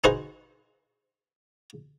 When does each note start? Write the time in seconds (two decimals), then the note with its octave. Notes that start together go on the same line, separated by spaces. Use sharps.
0.04 D#4 F#4 G#4 B4 C5 D#5